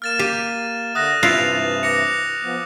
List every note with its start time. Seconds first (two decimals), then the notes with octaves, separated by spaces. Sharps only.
0.02 A#3 F6 A6 E7
0.19 G4 D#7
0.95 D3 E5 F#5 D#6 F#6 A#6
1.23 G2 C3 E3 E4 F4 F#6 F7
1.83 D6 A#6 C#7
2.43 F3 B3